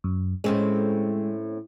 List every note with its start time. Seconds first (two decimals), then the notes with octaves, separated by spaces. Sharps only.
0.04 F#2
0.44 A2 G#3 C4 C#4